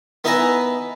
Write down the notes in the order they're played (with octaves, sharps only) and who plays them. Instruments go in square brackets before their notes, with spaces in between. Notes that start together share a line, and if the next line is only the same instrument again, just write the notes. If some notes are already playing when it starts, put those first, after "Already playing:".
[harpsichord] B3 D#4 E4 B4 G#5 A#5